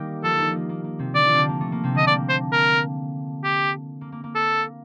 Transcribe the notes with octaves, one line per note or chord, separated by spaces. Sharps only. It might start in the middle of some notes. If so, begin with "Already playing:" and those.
Already playing: D#3 G3 A#3 D#4 G4 A#4
F3 F4 A4
D#3 D#4
A#3
A#3
A#3
C3 C4
D3 D4 D5
F3 F4
D3 C4 D4
A#3
A3
A#3
C3 C4
D3 D4 D#5
A#3 D5
C5
A#4
G4
A#3
A#3
A#3
A4